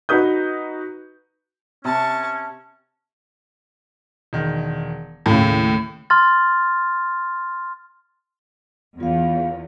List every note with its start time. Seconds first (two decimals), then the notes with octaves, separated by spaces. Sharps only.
0.09 D#4 F#4 B4 D#6 G6
1.85 C3 C#4 A5 C#6
4.33 E1 D#3
5.26 D#2 A2 C#3
6.10 C6 F6 A6
9.00 E2 F4 F5